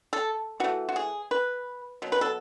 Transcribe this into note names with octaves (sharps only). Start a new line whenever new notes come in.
A4
E3 A3 F#4
F#4
G#4
B4
B2 F#3
B4
A4